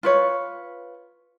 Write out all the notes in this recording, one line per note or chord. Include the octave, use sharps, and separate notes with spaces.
F4 B4 C#5